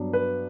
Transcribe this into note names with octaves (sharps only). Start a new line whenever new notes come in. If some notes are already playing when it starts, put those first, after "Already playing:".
Already playing: G2 F#3 B3 D4
B4